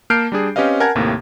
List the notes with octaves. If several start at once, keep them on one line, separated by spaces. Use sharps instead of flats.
A#3 A5 F6 G6 C7 D7
G3 D4 G#4
C4 C#4 G4 B4 D#5 F5
A#4 F#5 G#5 A5 G#6
D#2 A2 C3 A#3